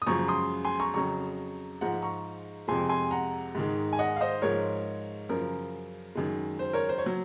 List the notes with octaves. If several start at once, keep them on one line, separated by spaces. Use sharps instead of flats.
D#6
F#2 C#3 F3 G#3 A#5 C#6
C6 D#6
G#5 C6
A#5 C#6
F2 C#3 F#3 A#5 C#6
G#2 F3 G#3 F#5 A#5
A#5 C#6
F2 C3 F3 G#3 G#5 C6
G#5 C6
F#5 A#5
G#2 D#3 G#3
G#5
D#5 F#5
F5
C5 D#5
G#2 F3 G#3 A#4 C#5
F#2 C#3 F3 A#4
F#2 D#3 G#3
C5
A#4 C#5
C5
C#5
F#3